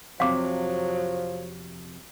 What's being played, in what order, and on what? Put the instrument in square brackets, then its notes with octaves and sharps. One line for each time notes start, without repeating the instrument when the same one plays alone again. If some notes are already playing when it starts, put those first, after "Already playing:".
[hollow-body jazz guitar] F2 C3 [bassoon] F3 [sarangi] F#3 [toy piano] F5 D6